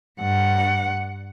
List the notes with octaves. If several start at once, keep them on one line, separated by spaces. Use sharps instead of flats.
G2 F#5